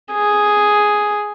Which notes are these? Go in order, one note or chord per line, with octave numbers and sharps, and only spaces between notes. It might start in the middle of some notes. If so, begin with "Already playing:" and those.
G#4